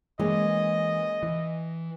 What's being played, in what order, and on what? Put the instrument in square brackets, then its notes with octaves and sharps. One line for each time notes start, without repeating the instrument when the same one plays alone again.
[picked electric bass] E3 [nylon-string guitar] G#3 A#3 C#4 [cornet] D#5
[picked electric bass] E3